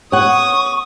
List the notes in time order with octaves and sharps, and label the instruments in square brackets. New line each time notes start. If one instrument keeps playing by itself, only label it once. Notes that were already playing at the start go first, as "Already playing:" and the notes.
[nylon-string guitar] C#5 F#5 [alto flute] C#6 [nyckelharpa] D#6